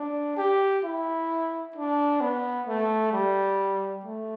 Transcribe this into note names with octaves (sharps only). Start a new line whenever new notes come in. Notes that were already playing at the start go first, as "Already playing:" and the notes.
Already playing: D4
G4
E4
D4
B3
A3
G3
A3